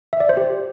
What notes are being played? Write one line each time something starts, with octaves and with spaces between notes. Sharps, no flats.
E5
D5
C5
G4